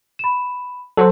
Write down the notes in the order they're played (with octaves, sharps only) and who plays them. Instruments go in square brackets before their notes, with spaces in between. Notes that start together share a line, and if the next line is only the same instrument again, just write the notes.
[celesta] B5 E7
[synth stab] F#3 [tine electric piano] A4 C5